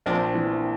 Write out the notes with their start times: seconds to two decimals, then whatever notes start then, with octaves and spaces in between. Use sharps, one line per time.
0.06 A#1 C4 D4
0.35 E3